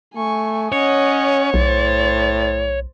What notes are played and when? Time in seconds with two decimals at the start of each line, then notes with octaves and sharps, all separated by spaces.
0.16 A3 G#5 C#6
0.72 C#4 C#5 D#5 F#5
1.54 B1 A2 C5 A6